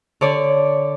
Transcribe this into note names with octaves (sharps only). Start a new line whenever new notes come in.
D3 C#5 D5